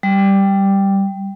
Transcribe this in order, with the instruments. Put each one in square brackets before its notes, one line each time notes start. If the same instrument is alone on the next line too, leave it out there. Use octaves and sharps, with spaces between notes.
[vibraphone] G3